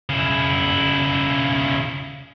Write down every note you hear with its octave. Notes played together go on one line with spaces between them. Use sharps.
C#3 E4